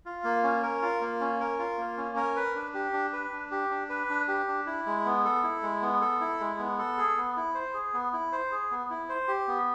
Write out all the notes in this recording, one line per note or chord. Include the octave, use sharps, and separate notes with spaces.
F4
A#3
C#4
A#4
F4
A#3
C#4
A#4
F4
A#3
C#4
A#4
B4
D4
G4
D4
B4
D4
G4
D4
B4
D4
G4
D4
E4
G#3
B3
A4
E4
G#3
B3
A4
E4
G#3
B3
A4
G#4
B3
E4
C5
G#4
B3
E4
C5
G#4
B3
E4
C5
G4
B3